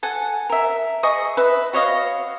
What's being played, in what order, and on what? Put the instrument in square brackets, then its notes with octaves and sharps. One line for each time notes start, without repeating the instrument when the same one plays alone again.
[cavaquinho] A4 F#5 G#5
A#4 E5
G#4 D#5 C#6 D#6
B4 E5
F#4 C#5 D#5 F5